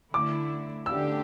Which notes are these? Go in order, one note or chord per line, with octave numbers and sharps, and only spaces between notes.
D3 A3 E4 D6
D3 A3 D4 G4 E6